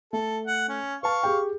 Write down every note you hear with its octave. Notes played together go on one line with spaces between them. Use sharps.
A3 A4
F#5
C#4
B4 F5 A5 C#6
G4 G#4 G5